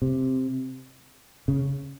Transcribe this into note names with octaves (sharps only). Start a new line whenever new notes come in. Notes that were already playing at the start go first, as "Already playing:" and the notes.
C3
C#3